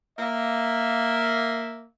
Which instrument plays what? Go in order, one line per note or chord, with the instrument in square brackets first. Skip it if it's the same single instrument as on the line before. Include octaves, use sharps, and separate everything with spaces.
[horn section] A#3 E5